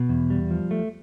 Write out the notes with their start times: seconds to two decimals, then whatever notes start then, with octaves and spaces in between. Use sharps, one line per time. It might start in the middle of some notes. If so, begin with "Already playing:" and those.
Already playing: B2
0.09 E2
0.30 G3
0.51 F3
0.71 A3